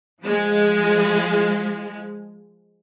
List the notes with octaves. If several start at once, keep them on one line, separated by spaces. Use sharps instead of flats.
F3 G#3